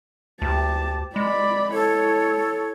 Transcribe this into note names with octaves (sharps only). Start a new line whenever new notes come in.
D2 G4 A5
G#3 D5 B5
E4 A4 C#5